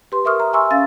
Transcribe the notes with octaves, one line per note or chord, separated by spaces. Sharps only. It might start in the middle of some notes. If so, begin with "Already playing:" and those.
G4 B4 C6
A#4 E5 C#6 D#6 F6
A#5
E5 G#5 A#5 C6 C#6 E6
C#4 F5 A6